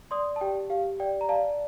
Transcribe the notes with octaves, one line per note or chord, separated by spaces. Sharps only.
D5 C6 D#6
A5
G4 G5
G4 F5
D5 G5
A#5
D5 F5 A5